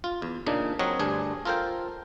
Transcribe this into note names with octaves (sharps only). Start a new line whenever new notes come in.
F4
E2
A#2 C#3 D4 D#4
F#3 C4 A#4 C#5 D#5 F#5
D2 G2 D4 G#4 G#5
F4 A4 A#4 C5 F5 G5